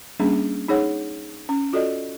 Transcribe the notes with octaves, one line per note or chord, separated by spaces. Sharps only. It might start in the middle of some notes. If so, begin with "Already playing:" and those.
G3 A#3 C#4 D4 G#4
D#4 G#4 C#5 F#5
C#4
F4 F#4 A4 D5 D#5